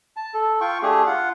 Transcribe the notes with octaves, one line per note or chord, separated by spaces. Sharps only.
A5
A4
F4 G5 C#6
A3 D4 G4 G#4
F4 F#5